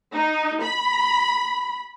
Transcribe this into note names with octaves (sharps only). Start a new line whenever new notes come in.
D#4
B5